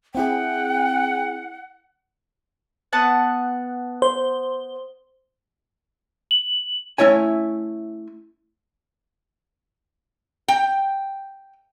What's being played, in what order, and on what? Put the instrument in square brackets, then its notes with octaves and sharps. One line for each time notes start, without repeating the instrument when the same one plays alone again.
[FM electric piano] C4 E4 G#4 [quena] F#5 [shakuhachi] G5
[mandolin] B3 F#5 A5
[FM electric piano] C5
[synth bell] F#7
[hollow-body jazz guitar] A3 C#4 E4 C#5 G#5
[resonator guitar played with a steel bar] G5